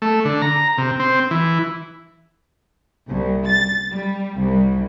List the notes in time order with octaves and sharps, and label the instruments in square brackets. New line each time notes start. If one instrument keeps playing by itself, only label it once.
[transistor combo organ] A3
D3
A#5
C3
C4
E3
[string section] C2
A6
G3
C2